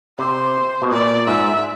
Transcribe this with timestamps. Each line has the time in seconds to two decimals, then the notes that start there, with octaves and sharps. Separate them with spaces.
0.18 C3 C5
0.82 B2
0.91 A#2 D5
1.27 G#2 E5